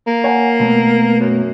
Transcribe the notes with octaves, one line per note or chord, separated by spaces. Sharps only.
A#3
C#5 F#5 G#5
B2 A3 B3
F#2